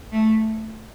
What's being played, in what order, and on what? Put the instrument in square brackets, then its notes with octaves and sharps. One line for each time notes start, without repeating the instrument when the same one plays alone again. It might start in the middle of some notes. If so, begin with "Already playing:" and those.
[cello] A3